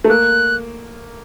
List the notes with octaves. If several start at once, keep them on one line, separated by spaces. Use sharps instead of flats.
A3
A#3 F#6